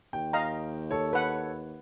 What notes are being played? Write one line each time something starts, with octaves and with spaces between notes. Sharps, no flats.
D#2 G5
D#5 F5 A#5
A4 C#5
B4 F#5